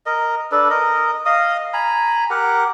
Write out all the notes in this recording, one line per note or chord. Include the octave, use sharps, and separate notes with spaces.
A#4 D#5
D4 A4 B4
A#4 D#5
D#5 F5 D#6
G#5 A#5 B5
G4 A#4 F#5